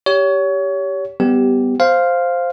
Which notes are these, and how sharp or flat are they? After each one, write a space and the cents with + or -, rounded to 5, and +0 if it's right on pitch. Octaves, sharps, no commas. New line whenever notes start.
G4 +0 C#5 +25
G3 -10 B3 +15 G4 +0
C5 +0 F5 +0